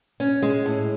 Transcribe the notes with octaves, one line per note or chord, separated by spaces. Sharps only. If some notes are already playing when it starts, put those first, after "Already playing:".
C#4
G#3
A2